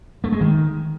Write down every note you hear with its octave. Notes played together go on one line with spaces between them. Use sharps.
A3
G#3
D#3